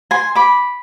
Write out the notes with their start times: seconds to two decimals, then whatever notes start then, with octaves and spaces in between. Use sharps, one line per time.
0.11 G#5 C6
0.35 B5 D6